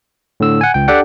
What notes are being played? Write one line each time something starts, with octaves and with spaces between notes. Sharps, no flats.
A2 D3 E6
F#5 G#5
C#2 G5
D4 G4 A4 D5 F#5 G5